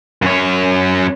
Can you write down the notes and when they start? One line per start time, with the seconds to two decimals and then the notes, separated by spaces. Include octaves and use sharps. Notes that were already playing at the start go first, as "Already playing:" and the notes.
0.22 F#2 C#5